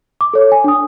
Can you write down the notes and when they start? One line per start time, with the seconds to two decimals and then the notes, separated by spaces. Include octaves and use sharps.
0.21 D6
0.34 A4 C#5
0.52 G#5
0.64 D4 D#6